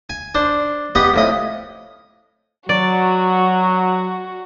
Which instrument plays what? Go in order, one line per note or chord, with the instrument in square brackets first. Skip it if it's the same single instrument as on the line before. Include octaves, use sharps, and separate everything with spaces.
[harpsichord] G#5
D4 C5
B3 G4 D#5 F#5
F2 A2 D#5
[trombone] F#3 [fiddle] F#4 [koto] D5